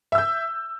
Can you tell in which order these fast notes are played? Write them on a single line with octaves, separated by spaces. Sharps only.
E5 E6 G6